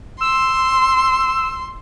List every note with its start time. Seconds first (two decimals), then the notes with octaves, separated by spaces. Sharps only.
0.21 C6 E6